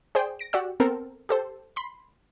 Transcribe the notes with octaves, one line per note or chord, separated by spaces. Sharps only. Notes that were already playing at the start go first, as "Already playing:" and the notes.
G#4 C5 D5 G5
A#6 D7
F#4 G4 D5 F#5 E6
B3 C4 A4 A#4 C5
G4 A4 C5
B5 C6